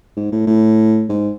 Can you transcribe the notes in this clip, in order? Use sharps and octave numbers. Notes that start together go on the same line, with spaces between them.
G#2
A2
A2
G#2